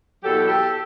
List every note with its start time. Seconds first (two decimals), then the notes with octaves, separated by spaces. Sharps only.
0.23 E2 B2 F#3 G4 A4
0.47 G4 A4